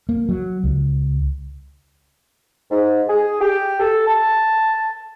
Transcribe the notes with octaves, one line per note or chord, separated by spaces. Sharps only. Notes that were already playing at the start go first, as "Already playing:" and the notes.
A#3
F#3
C#2
G#2
G#4
G4
A4
A5